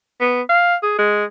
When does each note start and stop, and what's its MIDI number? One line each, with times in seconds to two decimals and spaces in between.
0.21 0.42 59
0.49 0.75 77
0.83 0.96 68
0.98 1.25 56